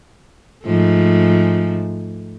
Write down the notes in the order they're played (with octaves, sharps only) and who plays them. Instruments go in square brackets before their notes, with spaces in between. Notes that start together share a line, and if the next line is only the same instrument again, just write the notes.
[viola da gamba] G#2 F3 A3